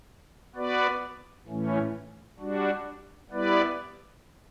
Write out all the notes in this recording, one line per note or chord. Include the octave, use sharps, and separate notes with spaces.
B3 F#4 B4 D5
A2 E3 A3 C#4
G3 D4 F#4
G3 B3 E4 B4 D5